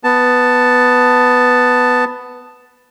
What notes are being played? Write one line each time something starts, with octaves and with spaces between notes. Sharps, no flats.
B3 A5